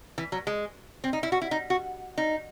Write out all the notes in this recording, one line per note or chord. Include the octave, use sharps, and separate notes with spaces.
E3
F#3
G#3
C4
D#4
E4
F#4
E4
D#4
F#4
D#4